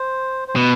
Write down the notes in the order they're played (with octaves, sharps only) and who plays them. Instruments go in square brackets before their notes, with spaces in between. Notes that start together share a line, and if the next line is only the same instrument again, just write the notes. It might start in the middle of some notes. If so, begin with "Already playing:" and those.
Already playing: [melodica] C5
C5
[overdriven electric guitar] B2 [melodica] B4